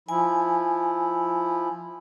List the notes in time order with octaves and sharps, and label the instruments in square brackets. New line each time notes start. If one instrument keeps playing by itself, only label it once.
[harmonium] F3 E4 [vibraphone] G#5